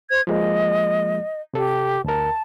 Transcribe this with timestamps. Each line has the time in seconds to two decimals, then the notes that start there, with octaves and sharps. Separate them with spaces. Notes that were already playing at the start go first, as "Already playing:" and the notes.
0.10 C5 G#6
0.27 F3 G#3 A#3 D#5
1.54 C3 G4 A4
2.04 D2 A#4 A5